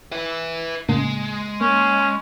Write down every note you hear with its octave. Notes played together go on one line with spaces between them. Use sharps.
B4 E5
A2 C#3 G#3 A#3
A#3 C#4